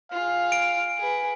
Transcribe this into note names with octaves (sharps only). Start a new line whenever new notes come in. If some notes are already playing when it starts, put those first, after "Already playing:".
F4 G#4 F5
D7
G#4 B4